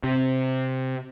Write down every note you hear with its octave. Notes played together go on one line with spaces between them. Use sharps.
C3